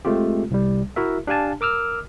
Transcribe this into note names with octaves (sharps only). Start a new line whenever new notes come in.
G#3 A3 C4 F4 G4
C2 G3
E4 F#4 A#4 E5
D4 G4 F5 G#5 A5
A#4 D6 E6 F6